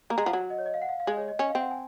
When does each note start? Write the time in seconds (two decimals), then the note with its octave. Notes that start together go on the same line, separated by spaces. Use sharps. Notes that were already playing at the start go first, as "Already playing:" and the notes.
0.10 A#3 A#5
0.18 G#3
0.25 F3 F#5
0.33 F#3
0.50 D#5
0.58 C#5
0.66 D#5
0.74 F5
0.82 F#5
0.89 F5
1.00 F5
1.06 G#3 D#5
1.17 C#5
1.28 D#5
1.39 C#4 D#5
1.49 F5
1.55 C4
1.61 F#5
1.71 G#5